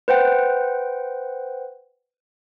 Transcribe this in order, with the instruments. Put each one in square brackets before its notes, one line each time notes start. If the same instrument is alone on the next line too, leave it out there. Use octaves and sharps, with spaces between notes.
[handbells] B4 C5 F#5 G5